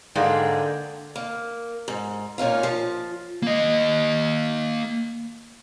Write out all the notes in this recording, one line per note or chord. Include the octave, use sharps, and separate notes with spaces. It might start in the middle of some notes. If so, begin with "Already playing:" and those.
G#2 D3 G#3 A#3 D5 G5
A#3
G#2
A#2 C#4 D#4 F4
F3
A#3 D#5